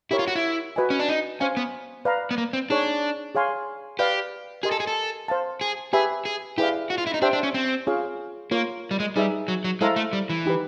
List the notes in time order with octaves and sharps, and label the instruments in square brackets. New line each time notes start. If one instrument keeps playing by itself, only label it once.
[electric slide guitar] E4 [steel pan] G4 A#4 C#5
[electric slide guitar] F4
F#4
E4
[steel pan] F#4 B4 D#5 G#5
[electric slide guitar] C#4
D4
D#4
[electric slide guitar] C#4 [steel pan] C5 F5 G#5
[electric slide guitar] B3
[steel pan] B4 D5 F5 A#5
[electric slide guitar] B3
A#3
C4
[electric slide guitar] D4 [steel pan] D#4 G#4 C#5
[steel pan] G#4 C#5 F5 G#5 C6
[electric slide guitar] G4 [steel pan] B4 D5 F5
[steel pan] G4 A#4 D#5 G#5 C6 [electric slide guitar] G#4
[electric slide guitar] A4
G#4
A4
[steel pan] C5 F5 A5
[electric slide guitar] G#4
[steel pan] G4 B4 E5 G#5 B5 [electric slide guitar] G#4
[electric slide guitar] G#4
[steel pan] E4 G#4 B4 D5 F5 [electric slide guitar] G4
[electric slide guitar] F#4
F4
E4
D#4
[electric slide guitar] D4 [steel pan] G4 C5 E5 G5
[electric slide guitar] D4
C#4
C4
[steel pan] C#4 F4 G#4 C#5 F5
[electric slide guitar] A#3 [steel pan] F4 A#4 C#5
[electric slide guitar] G3
G#3
[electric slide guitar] G3 [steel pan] D#4 G#4 B4 E5
[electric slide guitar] F#3
F#3
[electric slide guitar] G#3 [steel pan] E4 A4 C5 F5 A#5
[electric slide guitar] A3
G3
E3
[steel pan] D#4 G4 B4